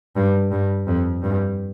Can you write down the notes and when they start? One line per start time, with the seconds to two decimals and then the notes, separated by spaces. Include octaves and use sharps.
0.16 G2
0.52 G2
0.87 F2
1.23 G2